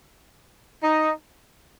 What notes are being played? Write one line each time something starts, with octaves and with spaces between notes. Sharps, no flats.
D#4